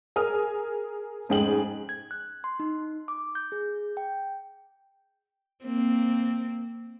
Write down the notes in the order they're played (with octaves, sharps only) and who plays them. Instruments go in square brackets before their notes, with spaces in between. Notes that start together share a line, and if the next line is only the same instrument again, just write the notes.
[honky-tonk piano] G#4 A#4 G#5 D#6 F6
F1 G#2 C#4 G#4 G5 F#7
[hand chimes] G#6
F#6
C6
D#4
D6
G6
G#4
G5
[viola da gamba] A#3 C4